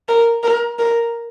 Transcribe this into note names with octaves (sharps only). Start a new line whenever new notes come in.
A#4
A#4
A#4